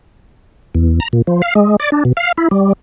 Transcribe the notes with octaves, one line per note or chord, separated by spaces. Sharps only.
E2
A#5
A#2
F3
F5
G#3
D5
D4
B2
F5
E4
G3